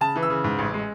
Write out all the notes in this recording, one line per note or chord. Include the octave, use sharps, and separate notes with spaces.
C#3 A5
E3
E6
C#3
G#2
A1
G#3